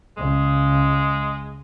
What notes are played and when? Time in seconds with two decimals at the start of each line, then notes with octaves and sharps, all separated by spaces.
0.17 C#2 C#3 G#3